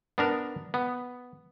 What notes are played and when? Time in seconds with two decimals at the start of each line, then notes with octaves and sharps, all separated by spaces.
0.18 B3 D4 A#4
0.74 B3